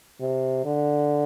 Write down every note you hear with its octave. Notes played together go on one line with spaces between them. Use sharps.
C3
D3